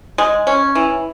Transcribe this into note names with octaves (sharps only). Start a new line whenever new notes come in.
G#3
C#4
E3